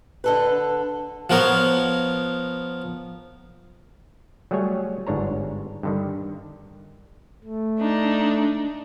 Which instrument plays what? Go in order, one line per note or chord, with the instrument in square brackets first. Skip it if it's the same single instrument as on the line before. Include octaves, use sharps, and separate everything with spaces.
[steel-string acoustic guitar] D3 A4 B4
[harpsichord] F3 B3 A#4 C#5
[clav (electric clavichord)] F#3 G3 A3 G#4 C#5 G#5
G1 G#2 D4 C#5 A#5
G2 D3 D#3
[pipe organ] A3
[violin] D4 D#4